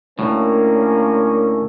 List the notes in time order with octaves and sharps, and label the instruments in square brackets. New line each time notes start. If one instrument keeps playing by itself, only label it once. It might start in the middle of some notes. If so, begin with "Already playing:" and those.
[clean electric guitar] D2 A2 [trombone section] A#3 C#4